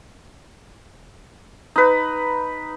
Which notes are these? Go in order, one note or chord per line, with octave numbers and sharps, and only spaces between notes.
D#4 B4